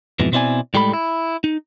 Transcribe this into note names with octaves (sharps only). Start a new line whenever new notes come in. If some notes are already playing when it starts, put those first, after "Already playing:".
F2 G#2 B2 E3
B2 C4 E4 D5 G#5
A2 G3 G#3 A4 B5
E4
D#4